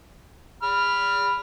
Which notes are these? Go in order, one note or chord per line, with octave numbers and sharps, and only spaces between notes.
B5 F6